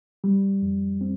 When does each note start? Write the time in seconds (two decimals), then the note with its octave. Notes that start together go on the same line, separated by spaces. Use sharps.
0.24 G3
0.62 F2
1.01 C4